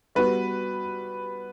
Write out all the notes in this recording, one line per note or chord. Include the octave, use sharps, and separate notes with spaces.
G3 B3 F#4 B4